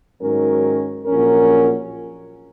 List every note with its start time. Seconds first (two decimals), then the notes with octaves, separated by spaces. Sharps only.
0.20 G#2 D#3 F#3 C#4 A#4
1.06 A#1 A#2 F#3 C#4 A#4